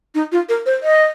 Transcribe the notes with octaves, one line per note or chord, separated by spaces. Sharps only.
D#4
F4
A#4
C5
D#5